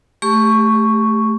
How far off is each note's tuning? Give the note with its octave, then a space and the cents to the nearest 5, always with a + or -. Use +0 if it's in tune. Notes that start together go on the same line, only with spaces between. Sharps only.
A3 -5 G4 +20 C#6 +0